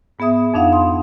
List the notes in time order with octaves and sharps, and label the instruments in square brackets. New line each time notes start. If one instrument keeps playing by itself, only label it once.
[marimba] G#2 B3 G#4 E5 D#6
F2 D4 D#4 F5 F#5 D#6
C6 D#6